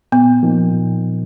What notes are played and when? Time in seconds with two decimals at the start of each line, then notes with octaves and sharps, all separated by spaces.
0.12 A#2 B3
0.43 F3 A#3 D#4
0.72 A#2